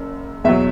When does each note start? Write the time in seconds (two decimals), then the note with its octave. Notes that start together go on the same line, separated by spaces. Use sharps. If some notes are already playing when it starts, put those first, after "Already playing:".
Already playing: F#1 F#2
0.44 E2 B2 F#3 E5